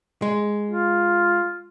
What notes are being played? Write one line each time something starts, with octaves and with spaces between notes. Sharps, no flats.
G#3
F4